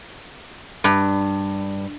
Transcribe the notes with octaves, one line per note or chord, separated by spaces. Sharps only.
G2